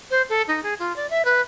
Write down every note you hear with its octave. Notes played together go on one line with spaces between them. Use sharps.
C5
A4
D#4
G#4
F4
D5
E5
B4